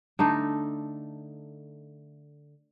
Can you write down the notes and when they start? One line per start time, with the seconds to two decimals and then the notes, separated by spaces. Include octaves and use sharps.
0.19 D3 A3 D#4